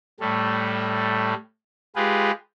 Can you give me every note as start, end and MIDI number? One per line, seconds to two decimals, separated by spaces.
0.20 1.34 45
0.20 1.34 55
0.20 1.34 57
1.96 2.31 56
1.96 2.31 65
1.96 2.31 67
1.96 2.31 68
1.96 2.31 71